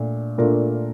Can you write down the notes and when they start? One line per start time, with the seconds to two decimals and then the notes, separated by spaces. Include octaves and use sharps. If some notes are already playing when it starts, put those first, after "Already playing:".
Already playing: A#2 A3 D4
0.38 A#2 A3 D4 F4 A#4